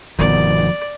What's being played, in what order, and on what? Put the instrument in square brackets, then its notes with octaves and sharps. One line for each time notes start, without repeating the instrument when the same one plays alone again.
[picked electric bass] G1 B2 D#3 [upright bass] F3 B3 [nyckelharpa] D5